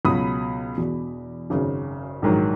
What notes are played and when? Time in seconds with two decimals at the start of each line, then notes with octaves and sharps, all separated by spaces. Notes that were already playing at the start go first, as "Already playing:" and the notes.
0.05 C#2 B2 F#3 B5 D#6
0.78 E1 E2 B2
1.50 G#1 F#2 C#3
2.22 A#1 G#2 D#3 F#3